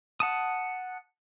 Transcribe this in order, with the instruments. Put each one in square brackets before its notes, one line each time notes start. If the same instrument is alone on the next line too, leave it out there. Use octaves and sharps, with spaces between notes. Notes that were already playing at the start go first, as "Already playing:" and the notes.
[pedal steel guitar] F#5 A5 D#6